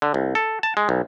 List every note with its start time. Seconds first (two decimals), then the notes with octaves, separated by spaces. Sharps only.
0.02 D3
0.14 C2
0.35 A4
0.63 A5
0.77 G#3
0.89 B1